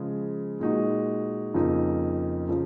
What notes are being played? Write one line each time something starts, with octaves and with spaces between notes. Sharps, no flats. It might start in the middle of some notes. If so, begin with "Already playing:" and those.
Already playing: C#3 F3 G#3
A#2 G#3 D#4 F#4
F2 C#3 F3 A#3 D#4
C#3 F3